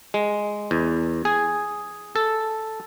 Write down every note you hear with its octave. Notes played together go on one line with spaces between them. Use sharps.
G#3
E2
G#4
A4